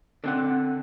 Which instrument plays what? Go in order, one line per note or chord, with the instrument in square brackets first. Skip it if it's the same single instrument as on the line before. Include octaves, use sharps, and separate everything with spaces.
[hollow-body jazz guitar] D3 C4 F#5